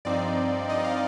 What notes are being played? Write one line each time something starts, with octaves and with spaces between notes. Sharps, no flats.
G2 F3 C4 D#4 D5
G2 F3 C4 D#4 D#5
F5